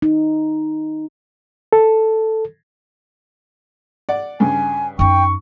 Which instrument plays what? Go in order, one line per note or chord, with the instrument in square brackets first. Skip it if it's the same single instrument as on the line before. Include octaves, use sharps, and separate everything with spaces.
[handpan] D#4
[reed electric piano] A4
[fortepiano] D5 F#5
[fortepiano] G2 C#3 [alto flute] G#5
[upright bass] F#2 D#4 [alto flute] G5 [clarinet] C#6